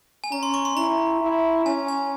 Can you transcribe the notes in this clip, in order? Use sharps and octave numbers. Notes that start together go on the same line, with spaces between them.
G#5
C#4 A#5
C6
C#6
C6
E4 A#5
E4
C#4 G#5
G#5